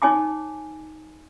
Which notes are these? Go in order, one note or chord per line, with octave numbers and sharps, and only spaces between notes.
D#4 C#5 G#5 A5 D6